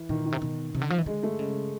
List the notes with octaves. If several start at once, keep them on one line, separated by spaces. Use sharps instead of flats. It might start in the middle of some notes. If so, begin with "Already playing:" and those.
Already playing: E3
A#2 D#3
D#3
C3
B2
C3
D3
F3
E3
D3 G#3
A3
C#3 G#3